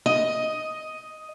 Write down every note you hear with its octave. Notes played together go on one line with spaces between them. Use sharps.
D#5